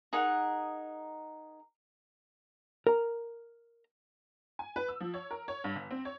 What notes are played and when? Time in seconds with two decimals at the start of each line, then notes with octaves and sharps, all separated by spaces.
0.13 D#4 G#4 A#4 F#5
2.87 A#4 A#5
4.59 G#5
4.76 B4
4.89 E6
5.00 F3
5.14 C#5
5.31 A#4
5.48 C#5
5.64 G2
5.76 G1
5.91 C4
6.05 C#5